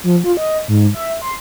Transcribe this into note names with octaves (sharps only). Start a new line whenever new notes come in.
F3
F4
D#5
G#2
E5
C6